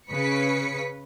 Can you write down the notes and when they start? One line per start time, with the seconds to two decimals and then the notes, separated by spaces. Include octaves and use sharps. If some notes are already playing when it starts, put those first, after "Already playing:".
0.11 C#3 B4 B6 C#7